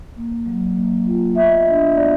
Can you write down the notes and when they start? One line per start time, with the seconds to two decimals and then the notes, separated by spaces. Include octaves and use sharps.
0.16 A#3
0.46 F#3
0.76 A#3
1.06 F4
1.35 B3 E5
1.44 D#5
1.52 E5
1.65 D4 D#5
1.95 B3 D5